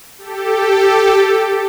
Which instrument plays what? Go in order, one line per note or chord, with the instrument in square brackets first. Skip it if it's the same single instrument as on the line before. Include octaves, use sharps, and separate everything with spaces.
[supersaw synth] G4 A4